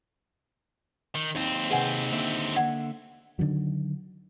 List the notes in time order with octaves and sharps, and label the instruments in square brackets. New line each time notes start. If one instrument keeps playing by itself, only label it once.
[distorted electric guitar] D#3
[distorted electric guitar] D#2 C4 [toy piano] D#4
[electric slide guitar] C3 G#4 [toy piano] B4 F#5 G#5
[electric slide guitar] D3 A#3 E5
[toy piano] D5 F#5
[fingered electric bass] D3 D#3 F#3